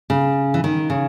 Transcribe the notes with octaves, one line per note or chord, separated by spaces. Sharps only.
C#3
E3
D#3
C#3